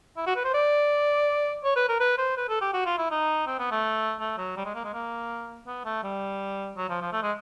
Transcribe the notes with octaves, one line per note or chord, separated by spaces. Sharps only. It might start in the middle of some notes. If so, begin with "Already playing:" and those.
E4
F#4
B4
C5
D5
C#5
B4
A#4
B4
C5
B4
A4
G4
F#4
F4
E4
D#4
C4
B3
A3
A3
F#3
G3
G#3
A#3
G#3
A#3
B3
A3
G3
F#3
F3
F3
A3
G#3